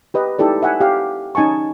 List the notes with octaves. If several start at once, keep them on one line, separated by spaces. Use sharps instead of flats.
G4 B4 D#5
D#4 E4 G4 A4 D5
E5 F#5 G#5
G4 F5
C#4 D#4 G#5 A5 C#6